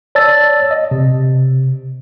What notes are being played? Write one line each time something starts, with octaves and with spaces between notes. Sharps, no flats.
C#5 D5 A5 E6 A6
D#5
C3